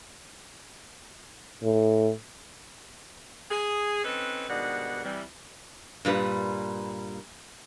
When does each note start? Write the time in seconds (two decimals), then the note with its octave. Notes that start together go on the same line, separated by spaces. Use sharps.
1.63 A2
3.50 G#4
4.04 C4 C#4 D#4 A4 B4
4.49 G#2 B2 D#3 G3 D4 F#5
5.04 C3 E3 G3
6.05 G2 A#2 G3 B4